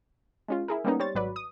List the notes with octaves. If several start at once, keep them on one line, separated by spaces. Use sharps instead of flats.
G#3 C#4 F4
E4 G#4 A#4
G3 G#3 A#3 B3 C#4 D#4
G3 C5 C#5 A6
G#1 F#3 B4 D5
D#6